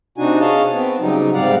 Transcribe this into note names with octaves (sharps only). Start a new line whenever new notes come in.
C3 D4 D#4 F#4 G#5
G#4 C#5 D#5 F5 A5
B3 C4
C#3 F#3 G3 D#4
G#2 C3 G3 D5 F5 F#5